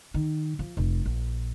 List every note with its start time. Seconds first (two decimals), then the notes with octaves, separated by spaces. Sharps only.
0.14 D#3
0.59 F3
0.77 F1
1.06 A#1